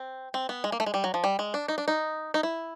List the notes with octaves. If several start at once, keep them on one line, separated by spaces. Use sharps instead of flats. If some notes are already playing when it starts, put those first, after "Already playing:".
Already playing: C4
C4
B3
G#3
A#3
A3
G#3
G3
F#3
F3
G3
G#3
D4
D#4
D4
D#4
D#4
E4